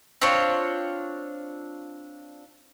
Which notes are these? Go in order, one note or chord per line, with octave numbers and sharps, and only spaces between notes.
C4 D4 F4 C#5